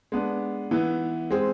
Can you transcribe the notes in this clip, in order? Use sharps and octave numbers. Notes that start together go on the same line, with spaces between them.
G#3 B3 D4
E3 B3 E4
G#3 C4 G#4